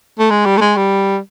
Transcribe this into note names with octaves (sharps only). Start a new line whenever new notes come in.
A3
G#3
G3
A3
G#3
G3